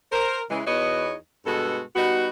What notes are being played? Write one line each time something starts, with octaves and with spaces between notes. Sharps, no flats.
A#4 C5
C#3 E3 G#3
E2 B3 D#4 F#4 C#5 D#5
G2 B2 G#3 F#4 A4
G3 B3 D#4 F#4